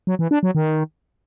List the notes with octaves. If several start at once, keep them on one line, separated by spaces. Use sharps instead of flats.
F#3
E3
D4
F#3
D#3